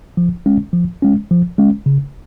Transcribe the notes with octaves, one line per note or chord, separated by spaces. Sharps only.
F3
G#3 C#4
F3
G#3 C#4
F3
G#3 C#4
C#3